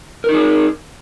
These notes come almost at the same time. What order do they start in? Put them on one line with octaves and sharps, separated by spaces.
A#4 D#4 G#4